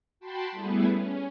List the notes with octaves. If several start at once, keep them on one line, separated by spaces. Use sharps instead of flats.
F#4 G5 A5 B5 C6
G3 A3 B3 E4 G#4 B4
C#4